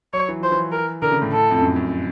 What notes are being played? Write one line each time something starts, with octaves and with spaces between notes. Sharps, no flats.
F#3 C#5
E3
F3 C5
E3
A#4
D3 A#4
C#3
A2
A4
F2
F#2
F#2